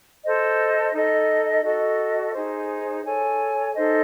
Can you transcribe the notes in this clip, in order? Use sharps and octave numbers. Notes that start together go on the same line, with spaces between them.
A4 C5 D#5
D#4 A4 D#5
F#4 A4 D#5
D#4 G#4 C5
A4 C#5 G#5
D#4 A4 C5 D#5